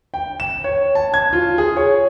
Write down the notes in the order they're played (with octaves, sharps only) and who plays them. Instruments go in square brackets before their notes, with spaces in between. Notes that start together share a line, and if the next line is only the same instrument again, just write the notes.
[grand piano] G5
E7
C#5
A5
G#6
F4
G#4
C#5